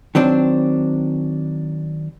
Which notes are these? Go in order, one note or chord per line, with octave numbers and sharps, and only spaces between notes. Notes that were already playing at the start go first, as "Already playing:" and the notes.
D#3 F#3 C4 D4